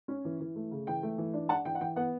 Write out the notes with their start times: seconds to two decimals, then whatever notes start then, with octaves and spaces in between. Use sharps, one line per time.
0.08 C#4
0.25 E3
0.40 E3
0.56 A3
0.71 C#3
0.87 E3 G5
1.03 A3
1.18 E3
1.33 D4
1.49 D4 F#5 A5
1.65 E3 G5
1.75 F#5
1.80 E3 G5
1.96 B3 F#5